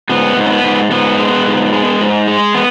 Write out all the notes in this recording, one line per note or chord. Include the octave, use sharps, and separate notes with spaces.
G#2 B3
G#2
C#4
B3
G#2
G#2 B3
G#3
G#2
G#3
G#2
G#3
B3